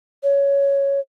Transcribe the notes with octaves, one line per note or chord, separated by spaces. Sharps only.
C#5